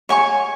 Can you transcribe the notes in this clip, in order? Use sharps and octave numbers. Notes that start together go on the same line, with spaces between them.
C#5 G#5 C#6